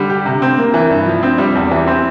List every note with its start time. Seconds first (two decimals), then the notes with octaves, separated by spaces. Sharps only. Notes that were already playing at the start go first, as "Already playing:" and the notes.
Already playing: D3 G3
0.10 G4
0.25 C3
0.42 C4
0.57 A#3
0.74 E3
0.90 G2
1.06 F3
1.23 C4
1.38 G3
1.55 E2
1.71 E3
1.87 C4